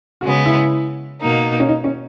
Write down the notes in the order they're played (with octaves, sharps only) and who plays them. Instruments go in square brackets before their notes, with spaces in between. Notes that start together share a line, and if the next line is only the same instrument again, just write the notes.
[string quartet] C#3 G#3 B3 [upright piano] F#4
[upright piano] E4
[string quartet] B2 A#3 D#4
[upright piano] C#4
D#4
C#4